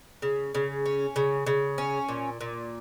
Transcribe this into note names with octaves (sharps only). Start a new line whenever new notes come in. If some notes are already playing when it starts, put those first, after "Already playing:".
C#3
C#3
C#4
C#3
C#3
C#4
A#2
A#2